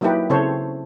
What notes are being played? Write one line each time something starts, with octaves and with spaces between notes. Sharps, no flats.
F#3 A#3 D#4 E4 G4 B4
C#3 C4 E4 A4 C5 C#5